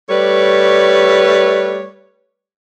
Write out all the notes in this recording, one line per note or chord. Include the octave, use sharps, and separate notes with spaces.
G3 A3 B4 C#5 D5